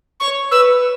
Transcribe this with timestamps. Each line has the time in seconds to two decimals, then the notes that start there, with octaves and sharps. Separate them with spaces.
0.20 C#5 C#6
0.51 B4 E6